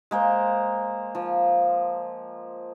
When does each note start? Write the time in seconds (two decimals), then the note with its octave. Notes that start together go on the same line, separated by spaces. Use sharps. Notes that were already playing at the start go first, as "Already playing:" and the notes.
0.11 G#3 A#3 C5
1.15 F3